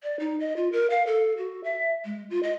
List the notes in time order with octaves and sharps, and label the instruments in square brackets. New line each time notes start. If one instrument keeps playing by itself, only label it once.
[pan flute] D5
D#4
D#5
F4
A#4
F5
A4
F#4
E5
G#3
F4
D#5